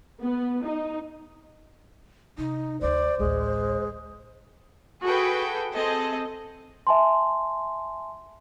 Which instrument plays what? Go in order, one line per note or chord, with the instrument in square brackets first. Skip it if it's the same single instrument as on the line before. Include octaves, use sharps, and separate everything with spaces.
[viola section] B3
D#4
[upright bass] C3 [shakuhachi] D#4
[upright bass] D2 A3 [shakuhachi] C5 [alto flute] D5
[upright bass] A1 D2 [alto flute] G#3
[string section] F#4 G#4 A4 B4 G5
C4 G#4 A4 D#5
[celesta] E5 G#5 A5 C6